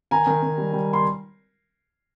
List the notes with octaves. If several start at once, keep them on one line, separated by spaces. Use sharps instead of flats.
D#3 G#5 A#5
D#3
D#3
G3
G3
C6